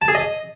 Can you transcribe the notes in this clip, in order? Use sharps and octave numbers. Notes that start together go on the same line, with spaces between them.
A5
G#4
D#5